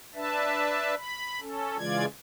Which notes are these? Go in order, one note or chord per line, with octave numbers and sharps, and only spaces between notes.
D4 B4 E5 A5
B5
C#4 A4
C#3 E3 G#3 F4 D5 G#6